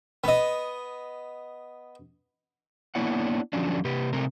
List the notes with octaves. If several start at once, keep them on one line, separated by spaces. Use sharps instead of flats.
B3 D#5
A#3 B3 D4 E4 C#5 F#5
D3 F3 F#3 C#4 D4
C3 G4 B4
C3 A3 C4 A#4